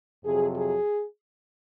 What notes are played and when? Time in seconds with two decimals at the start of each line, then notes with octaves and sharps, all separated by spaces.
0.24 F2 C3 F#3 G#4
0.56 G#4